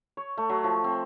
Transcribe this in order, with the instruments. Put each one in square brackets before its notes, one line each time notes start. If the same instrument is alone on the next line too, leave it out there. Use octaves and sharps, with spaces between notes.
[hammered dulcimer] C#5
A3
F#3
F3
C4